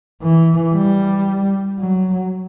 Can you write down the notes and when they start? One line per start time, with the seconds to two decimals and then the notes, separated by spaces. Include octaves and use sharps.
0.23 E3
0.75 G3
1.80 F#3